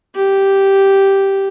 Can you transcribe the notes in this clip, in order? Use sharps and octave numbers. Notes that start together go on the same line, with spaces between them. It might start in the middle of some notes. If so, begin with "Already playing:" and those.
G4